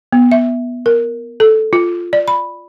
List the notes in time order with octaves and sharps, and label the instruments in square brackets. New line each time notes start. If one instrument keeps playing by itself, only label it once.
[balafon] B3
E5
A#4
A4
F4
D5
B5